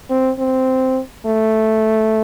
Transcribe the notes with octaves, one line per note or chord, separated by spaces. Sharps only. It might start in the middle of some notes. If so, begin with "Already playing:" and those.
C4
C4
A3